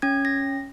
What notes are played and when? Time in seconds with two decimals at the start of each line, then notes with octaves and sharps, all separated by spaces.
0.02 C#4 G#6
0.25 A#6